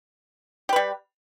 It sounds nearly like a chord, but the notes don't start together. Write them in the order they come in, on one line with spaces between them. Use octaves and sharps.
G4 B4 G3